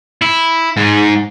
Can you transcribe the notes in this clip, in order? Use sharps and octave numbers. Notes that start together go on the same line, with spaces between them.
E4
G#2